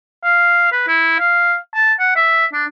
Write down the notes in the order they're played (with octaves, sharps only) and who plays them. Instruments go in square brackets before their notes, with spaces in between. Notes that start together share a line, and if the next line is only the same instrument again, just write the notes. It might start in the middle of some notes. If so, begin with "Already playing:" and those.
[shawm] F5
B4
E4
F5
A5
F#5
E5
D4